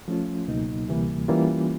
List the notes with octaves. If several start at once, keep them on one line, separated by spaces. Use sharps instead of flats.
F3 A3 C#4 F4
C#2 B2 F#3 A#3 D#4
D2 C3 E3 G3 A#3
E3 G3 A#3 C#4 F4